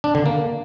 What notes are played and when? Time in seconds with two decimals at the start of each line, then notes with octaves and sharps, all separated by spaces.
0.04 D4
0.15 D3
0.26 A#3